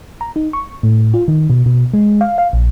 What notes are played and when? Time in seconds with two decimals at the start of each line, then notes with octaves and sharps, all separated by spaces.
0.21 A#5
0.36 D#4
0.53 C#6
0.83 A2
1.14 F4
1.28 D#3
1.50 B2
1.66 B2
1.94 G#3
2.21 F5
2.38 F5
2.53 A#1